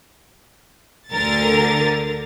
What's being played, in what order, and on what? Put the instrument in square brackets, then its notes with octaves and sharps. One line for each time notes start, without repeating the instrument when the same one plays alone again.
[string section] D2 D3 A#4 A6